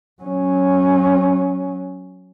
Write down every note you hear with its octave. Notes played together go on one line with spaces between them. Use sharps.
F#3 C#4